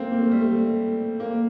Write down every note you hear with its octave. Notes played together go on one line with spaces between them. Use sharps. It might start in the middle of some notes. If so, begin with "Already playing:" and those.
Already playing: A3 A#3 C4
A#3
A3
G3
A3
A#3